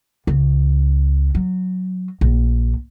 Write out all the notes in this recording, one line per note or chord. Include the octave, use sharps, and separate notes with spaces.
C#2
F#3
A#1